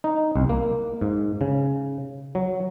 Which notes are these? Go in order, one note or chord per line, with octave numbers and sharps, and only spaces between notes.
D#4
C2
A#3
G#2
C#3
F#3